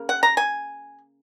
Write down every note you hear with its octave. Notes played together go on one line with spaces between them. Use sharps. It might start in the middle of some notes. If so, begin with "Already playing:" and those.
Already playing: C#3 A#3
F#5
A#5
G#5